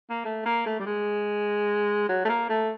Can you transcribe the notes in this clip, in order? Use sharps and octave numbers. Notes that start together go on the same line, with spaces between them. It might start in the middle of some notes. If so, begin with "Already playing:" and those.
A#3
A3
A#3
A3
G3
G#3
F#3
A3
A#3
A3